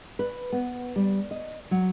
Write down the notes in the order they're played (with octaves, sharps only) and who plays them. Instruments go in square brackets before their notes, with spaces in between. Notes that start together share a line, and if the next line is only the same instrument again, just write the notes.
[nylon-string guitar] B4
B3
G3
D#5
F#3